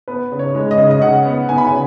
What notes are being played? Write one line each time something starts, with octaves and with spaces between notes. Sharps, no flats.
B3 B4
C#3
C#5
G#3
D#5
C#3
D#5
C#3 F#5
B3
B3 G#5
B5
C#3 G#5